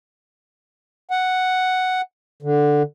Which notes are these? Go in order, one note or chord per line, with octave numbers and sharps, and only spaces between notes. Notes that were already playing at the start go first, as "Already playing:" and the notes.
F#5
D3